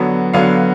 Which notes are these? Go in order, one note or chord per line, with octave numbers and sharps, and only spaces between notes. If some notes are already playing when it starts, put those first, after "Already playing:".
Already playing: D3 F#3 B3
D3 F#3 B3 F5